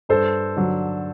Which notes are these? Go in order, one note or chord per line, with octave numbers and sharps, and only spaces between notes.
G2 A4 C5
D3 F#3